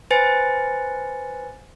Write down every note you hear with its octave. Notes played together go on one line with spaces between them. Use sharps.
B4 C5 G#5 A6 C#7